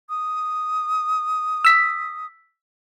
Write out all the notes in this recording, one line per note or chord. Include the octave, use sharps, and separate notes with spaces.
D#6
E6 B6